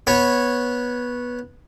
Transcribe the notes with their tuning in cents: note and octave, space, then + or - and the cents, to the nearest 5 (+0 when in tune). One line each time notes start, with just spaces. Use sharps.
B3 -15 C#5 -10